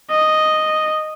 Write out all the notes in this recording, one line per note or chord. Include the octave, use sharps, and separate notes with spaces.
D#5